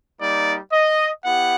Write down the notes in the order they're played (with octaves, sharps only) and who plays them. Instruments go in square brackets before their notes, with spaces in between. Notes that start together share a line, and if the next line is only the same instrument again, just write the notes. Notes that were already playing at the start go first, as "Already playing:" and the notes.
[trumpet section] G3 A#3 D#4 D5
D#5
B3 E4 G4 F#5